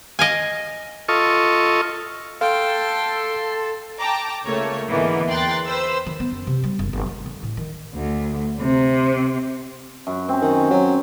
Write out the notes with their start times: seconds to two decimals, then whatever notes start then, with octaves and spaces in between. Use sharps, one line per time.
0.19 D#5 F5 G#5
1.09 F4 A4 D#5 C#6
2.41 A4 F5 G5 C6
3.99 G5 A5 A#5 D6
4.46 C#2 A3 A#3 C#5
4.88 G#2 D3 E3 A#3 B3 D#4
5.28 E2 A#4 G5 C6 F#6 A6
5.66 B4 C5 E6
6.06 D#3
6.20 B3
6.32 F#2
6.47 C3
6.64 G3
6.79 F#1
6.93 G1
7.06 G#3
7.26 D3
7.43 A2
7.57 D#3
7.94 D2
8.61 C3
10.07 F#2
10.29 C4 C#4
10.42 D#3
10.71 F#3